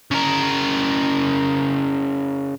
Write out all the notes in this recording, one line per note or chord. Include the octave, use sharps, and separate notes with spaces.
C#3 A#4